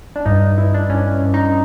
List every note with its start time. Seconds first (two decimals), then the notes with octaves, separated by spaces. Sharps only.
0.16 D4
0.26 G2 D#4
0.58 G2 E4
0.74 D4
0.90 G2 C#4
1.22 G2
1.34 D#4